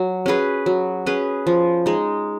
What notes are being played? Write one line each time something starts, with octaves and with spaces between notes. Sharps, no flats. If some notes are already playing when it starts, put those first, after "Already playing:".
Already playing: F#3
C#4 G#4 B4
F#3
C#4 G#4 B4
F3
G#3 D#4